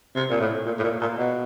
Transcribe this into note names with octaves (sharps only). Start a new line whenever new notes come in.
C3
A#2
A2
A#2
A2
A#2
A#2
B2